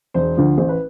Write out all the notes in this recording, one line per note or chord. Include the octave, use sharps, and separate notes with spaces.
E1 C5
D2 D3 F3
A1 C5
B4